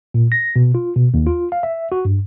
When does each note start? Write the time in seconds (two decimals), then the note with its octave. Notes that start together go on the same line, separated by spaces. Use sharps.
0.14 A#2
0.32 A#6
0.56 B2
0.75 F4
0.96 B2
1.14 D#2
1.27 F4
1.52 F5
1.63 E5
1.92 F#4
2.05 G2